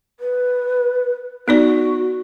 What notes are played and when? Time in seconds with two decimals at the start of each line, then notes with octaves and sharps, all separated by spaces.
0.20 B4
1.48 B3 D#4 F#4 D5